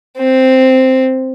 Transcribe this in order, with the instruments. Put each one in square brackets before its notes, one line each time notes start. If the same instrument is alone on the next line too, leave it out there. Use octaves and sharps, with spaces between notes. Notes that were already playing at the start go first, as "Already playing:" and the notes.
[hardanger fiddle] C4